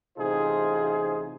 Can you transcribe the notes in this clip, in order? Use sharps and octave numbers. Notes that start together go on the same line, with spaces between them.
A1 C3 D#4 F4 G#4 C5